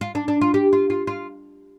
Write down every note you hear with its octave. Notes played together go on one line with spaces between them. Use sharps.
F4
D4
D4
F4
G4
F4
F4
F4